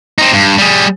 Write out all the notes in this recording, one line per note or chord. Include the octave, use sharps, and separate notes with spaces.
C4 D#4
G2
G3 G#4